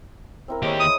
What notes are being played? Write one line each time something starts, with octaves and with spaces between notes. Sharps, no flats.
C4 E4 A#4
D#2 G#3 G4 C5 C#5
E4 D#6